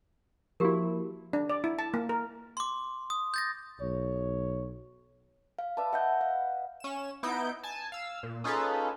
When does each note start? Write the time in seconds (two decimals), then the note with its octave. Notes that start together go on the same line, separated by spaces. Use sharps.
0.60 F3 A#3 E4 F#4 G4 A#4
1.33 D4
1.50 D5
1.64 E4
1.79 A5
1.94 A#3
2.09 A#4
2.57 C6 D6
3.10 D#6
3.34 G6 A6 A#6
3.81 B1 C#5
5.59 F5
5.77 B4 D5 E5 A5
5.93 D#5 E5 F#5 G6
6.21 F5
6.80 C#4 E7
7.23 B3 D#4 E4 G6 D7
7.63 G#5 A5
7.92 F5 E6
8.23 A#2
8.44 C#4 D#4 F4 G#4 A4 B4